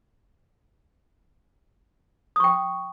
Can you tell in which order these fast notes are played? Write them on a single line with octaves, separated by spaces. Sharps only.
D#6 C#6 G5